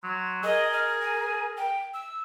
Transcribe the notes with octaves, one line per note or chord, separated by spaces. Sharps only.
F#3 C6
G#4 A#4 D#5
F6
G#5
G5
E6